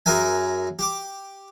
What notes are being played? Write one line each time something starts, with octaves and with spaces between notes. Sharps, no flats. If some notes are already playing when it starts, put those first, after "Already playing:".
F#2 G#4 A#4 E5 G#5
G4 D6